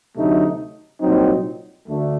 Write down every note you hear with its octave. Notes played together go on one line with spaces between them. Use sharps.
D2 C3 F#3 A3 D#4
C2 A#2 F#3 C4 D#4
D2 D3 A3